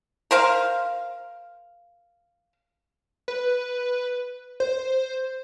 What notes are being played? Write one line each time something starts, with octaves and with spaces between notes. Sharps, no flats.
A#4 C5 F5
B4
C5